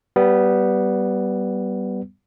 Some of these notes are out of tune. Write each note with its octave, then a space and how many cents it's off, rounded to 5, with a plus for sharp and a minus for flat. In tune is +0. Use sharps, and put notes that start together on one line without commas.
G3 -15 B3 +0